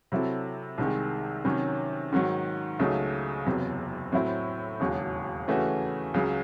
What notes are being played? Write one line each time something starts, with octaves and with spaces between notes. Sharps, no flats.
C3 F#3 C4 E4 A4
C2 C3 D#3 G#3
C3 D#3 F#3 C#4
G#2 D#3 F#3
C#2 C#3 F#3 A3 D#4
F#1 E2 C3 F#3
A2 F#3 C4 E4
E1 D#2 C#3 F#3
C#3 E3 A3 C#4 F#4
C#2 C#3 F#3